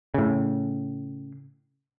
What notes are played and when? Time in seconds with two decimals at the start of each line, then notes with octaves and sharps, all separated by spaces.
0.14 A2 C#3